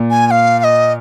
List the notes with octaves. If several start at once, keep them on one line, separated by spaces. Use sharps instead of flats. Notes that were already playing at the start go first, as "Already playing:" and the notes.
Already playing: A#2
G#5
G#5
F5
F5
D#5